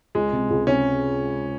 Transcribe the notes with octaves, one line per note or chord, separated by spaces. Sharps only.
C#2 G#3
C3
C#2
C3 C#4